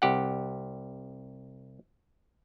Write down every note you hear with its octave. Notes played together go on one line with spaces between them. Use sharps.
C2 G4 F#5